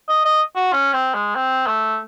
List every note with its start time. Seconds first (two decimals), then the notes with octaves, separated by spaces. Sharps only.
0.08 D#5
0.25 D#5
0.56 F#4
0.73 C#4
0.93 C4
1.14 G#3
1.35 C4
1.67 A3